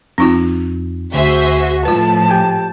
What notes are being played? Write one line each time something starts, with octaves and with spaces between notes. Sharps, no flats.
F2 C4 D#4 F4
D2 F#4 G#4 C5 E5
A2 F3 F4 B4 A5
G4 G5 G#5